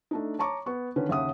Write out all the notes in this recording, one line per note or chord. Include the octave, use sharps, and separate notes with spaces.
A3 D4 D#4
C#5 A5 A#5 C#6 D6
B3 C#6
D3 D#3 C#4 B4
D#2 C#3 E5 F#5 D#6